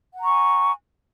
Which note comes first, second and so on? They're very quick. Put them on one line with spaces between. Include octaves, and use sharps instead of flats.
F#5 A#5 C#6 G#5